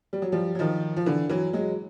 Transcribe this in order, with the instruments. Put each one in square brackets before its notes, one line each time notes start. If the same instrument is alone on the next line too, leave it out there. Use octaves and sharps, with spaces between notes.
[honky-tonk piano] G3
F#3
F3 G3
F#3
D#3 F3
F3
D3 E3
E3 F#3
F#3 G#3